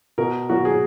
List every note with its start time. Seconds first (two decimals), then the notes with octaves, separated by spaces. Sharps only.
0.18 B2 A#4
0.50 F#3 A#3 F#4
0.65 G#4